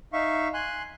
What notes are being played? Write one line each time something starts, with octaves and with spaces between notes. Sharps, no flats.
D#4 E5 F5 C#6
G#5 C6 F#6